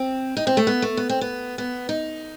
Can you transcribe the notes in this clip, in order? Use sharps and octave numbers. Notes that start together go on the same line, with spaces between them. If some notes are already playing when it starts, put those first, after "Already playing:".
Already playing: C4
D#4
C4
A3
B3
A3
B3
C4
B3
B3
D#4